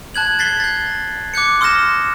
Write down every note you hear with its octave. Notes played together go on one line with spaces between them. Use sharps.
A5 F#6 G#6 F#7
G#6 A6 B6 C7 G7
G6 A6
D6 F#6 G6 C#7
C6 D#6 F6 G6 A#6 E7